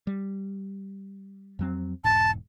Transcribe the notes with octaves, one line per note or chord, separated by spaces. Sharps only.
G3
F2 F#3 C4
E1 G#2 A5